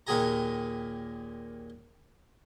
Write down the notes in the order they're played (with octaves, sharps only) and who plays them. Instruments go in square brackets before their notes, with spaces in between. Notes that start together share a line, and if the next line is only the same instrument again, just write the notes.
[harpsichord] D#2 A#2 G4 G#4 G#5 A#5